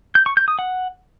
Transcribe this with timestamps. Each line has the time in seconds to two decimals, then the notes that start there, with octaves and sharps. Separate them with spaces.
0.15 G6
0.26 C#6
0.37 G6
0.48 D#6
0.59 F#5